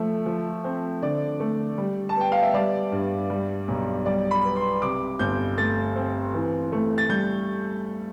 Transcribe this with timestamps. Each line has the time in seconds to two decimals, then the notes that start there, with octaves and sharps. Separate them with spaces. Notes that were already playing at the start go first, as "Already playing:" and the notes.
Already playing: F3 A3 E5
0.26 F3
0.64 C4
1.02 D3 D5
1.40 A3
1.78 G3
2.09 A5
2.16 B3
2.21 G5
2.32 F5
2.43 E5
2.54 G3 D5
2.92 G2
3.30 G3
3.68 B1
4.06 G3 D5
4.31 B5
4.43 B3
4.56 C6
4.82 C3 D6
5.19 G1 G6
5.58 A3 A6
5.96 C4
6.34 E3
6.72 A3
6.98 A6
7.09 G3 G6